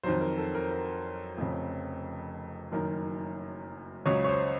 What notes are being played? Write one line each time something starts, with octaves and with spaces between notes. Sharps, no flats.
F2 D#3 F#3 C5
A#4
A4
A#4
A#4
F1 F2 C#3
F#1 F#2 D#3 A#4
C#2 C#3 F#3 C#5
C#5
C5